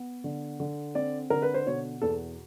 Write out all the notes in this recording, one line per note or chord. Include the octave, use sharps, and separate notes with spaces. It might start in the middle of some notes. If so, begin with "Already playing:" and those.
Already playing: B3
D3
D3
C4 D5
D3 A#4
B4
C5
B2 C#5
E2 A4